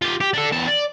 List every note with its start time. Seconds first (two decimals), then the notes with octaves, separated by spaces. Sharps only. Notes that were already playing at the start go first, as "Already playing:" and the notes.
0.02 F4 G4
0.21 G4
0.33 D4 A4
0.52 E2 A5
0.67 D5